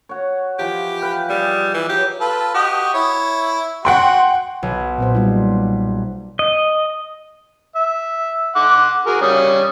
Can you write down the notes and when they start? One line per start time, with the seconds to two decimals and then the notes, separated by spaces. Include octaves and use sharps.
0.09 F#4 C#5
0.59 E3 F3 G4
1.02 B4 F5 G5
1.30 G3 G#4 D#5
1.74 E3
1.89 F#3 G4
2.21 F4 A4 B4
2.54 F#4 G4 D#5
2.94 E4 C#5
3.85 F#4 F#5 G5 C6
4.63 B1
4.98 A#2 B3 C5
5.15 G3 D#4 F4
6.39 D#5
7.76 E5
8.56 F#5 C6 D6
9.06 F#4 G#4 A#4
9.21 G3 C#4 D#6